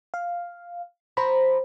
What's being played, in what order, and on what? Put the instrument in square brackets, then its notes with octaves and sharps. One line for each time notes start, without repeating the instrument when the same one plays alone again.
[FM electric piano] F5
[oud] F3 [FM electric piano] C5 A#5 B5